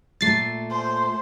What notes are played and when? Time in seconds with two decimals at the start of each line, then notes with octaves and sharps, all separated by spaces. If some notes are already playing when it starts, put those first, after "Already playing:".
0.21 A#2 A3 A6 C7
0.70 C5